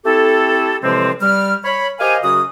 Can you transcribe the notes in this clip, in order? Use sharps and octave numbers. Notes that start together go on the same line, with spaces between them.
A3 C4 E4 G4 A4
A2 C3 E3 F3 G#3 C4
G3 F6
C#5 B5
G4 A#4 C5 D#5 F5 G#5
F#2 C#3 F#3 C#4 F#4 D#6